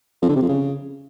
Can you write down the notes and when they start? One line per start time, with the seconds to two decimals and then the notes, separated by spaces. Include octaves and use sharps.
0.22 F2
0.29 D3
0.36 C3
0.42 F2
0.49 C#3